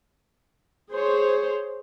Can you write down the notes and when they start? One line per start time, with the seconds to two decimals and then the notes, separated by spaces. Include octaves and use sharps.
0.91 G#4 C5 C#5